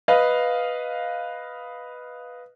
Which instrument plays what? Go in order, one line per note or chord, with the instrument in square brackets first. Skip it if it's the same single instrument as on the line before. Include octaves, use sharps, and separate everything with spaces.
[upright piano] B4 D#5 F5